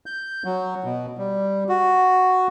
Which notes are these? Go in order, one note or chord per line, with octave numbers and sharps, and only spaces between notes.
G6
F#3
B2
G3
F#4